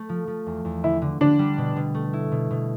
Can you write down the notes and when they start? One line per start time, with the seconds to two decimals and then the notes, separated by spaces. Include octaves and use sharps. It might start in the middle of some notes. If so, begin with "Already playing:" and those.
Already playing: A3
0.09 F3
0.27 F3
0.46 E2
0.65 E2
0.83 D3 E4
1.02 D3
1.21 D3 D4
1.39 G3
1.58 B2
1.76 B2
1.95 A3
2.13 E4
2.32 B2
2.51 B2